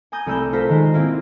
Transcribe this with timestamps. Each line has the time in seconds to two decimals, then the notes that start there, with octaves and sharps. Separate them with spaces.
0.12 G#5 A#5 D#6 G6 G#6
0.26 C2 A3 E6 G6
0.53 F4 A4 C5 A#5 B6
0.69 D#3 G#3 C5
0.94 A#3 C4 E4 F4